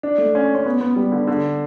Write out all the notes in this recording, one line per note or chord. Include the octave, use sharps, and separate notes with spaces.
D4
A3
C#4
C#4
B3
B3
G3
D3
D3